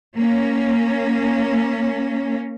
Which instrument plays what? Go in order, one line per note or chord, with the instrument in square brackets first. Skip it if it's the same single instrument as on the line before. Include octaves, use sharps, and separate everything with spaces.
[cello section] A#3 C#4